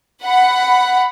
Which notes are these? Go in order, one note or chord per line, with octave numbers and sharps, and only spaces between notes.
F#5 B5